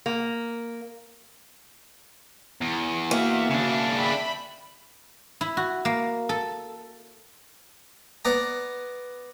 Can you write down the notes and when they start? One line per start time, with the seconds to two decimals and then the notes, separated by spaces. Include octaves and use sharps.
0.06 A#3
2.61 E2
3.11 A#3 F#4 E5
3.50 C#3 D4
3.95 E5 G5 B5
5.41 E4
5.57 F#4
5.85 A#3
6.29 A4
8.25 B3 D5 A#5